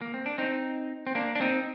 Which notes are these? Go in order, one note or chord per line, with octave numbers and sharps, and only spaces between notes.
A#3
C4
D4
C4 D#4
C4
A#3 D4
D4
C4 D#4